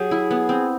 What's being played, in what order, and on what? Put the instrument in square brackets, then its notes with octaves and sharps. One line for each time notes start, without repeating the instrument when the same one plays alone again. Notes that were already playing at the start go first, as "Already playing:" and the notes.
Already playing: [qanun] F#3 G4 [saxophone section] G#4
[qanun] E4
B3
C4